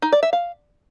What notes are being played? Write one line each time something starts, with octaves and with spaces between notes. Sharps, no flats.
D#4
D5
E5
F5